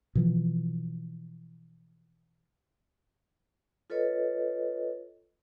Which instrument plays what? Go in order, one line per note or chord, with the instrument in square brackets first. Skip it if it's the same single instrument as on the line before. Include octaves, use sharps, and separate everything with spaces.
[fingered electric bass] B2 E3 F3
[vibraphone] F4 A4 B4 C#5 D#5